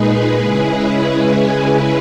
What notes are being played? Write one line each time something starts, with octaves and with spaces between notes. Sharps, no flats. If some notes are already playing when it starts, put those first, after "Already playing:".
Already playing: A#2 G#3 D#4 G#4 B4
C#3 G#3 C#4 E4